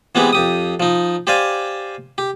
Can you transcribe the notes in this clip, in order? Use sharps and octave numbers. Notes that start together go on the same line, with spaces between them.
E3 G#3 B3 C4 E4 G4
F2 G4 D#6
F3 D#4
G4 C5 D5 F5 G#5
G4